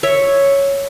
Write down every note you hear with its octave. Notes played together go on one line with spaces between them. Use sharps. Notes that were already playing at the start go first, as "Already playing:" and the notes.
C#5 E5